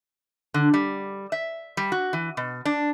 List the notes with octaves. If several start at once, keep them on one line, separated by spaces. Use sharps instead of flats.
D3
G3
E5
G3
F#4
E3
B2
D4